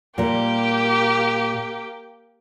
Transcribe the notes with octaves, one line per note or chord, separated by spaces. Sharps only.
A#2 G3 A#3 G4 A#4